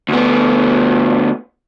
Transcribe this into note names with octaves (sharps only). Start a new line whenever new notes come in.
D2 B3